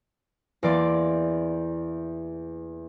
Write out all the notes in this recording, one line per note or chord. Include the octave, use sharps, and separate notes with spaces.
E2 E3 A#3 D5 C6 D6